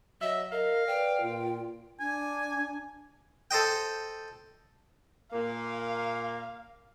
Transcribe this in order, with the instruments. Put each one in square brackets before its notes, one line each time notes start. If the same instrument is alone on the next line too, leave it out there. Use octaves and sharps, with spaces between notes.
[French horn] F#3 [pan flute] D#5 [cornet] E5
[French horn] A#4 [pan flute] D#5 [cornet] F5
[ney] B4 [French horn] D5 [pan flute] G5
[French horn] A#2 [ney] F4
[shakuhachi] D4 [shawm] G#5
[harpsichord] A4 C5 D#5 G5
[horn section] A#2 A#3 [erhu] F5